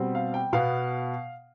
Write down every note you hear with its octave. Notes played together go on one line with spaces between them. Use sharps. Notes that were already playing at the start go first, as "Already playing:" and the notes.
Already playing: B2 G3 C4
F5
G5
B2 B3 F5